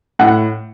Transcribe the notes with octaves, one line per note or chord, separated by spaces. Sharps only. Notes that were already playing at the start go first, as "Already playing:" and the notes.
A2 F#5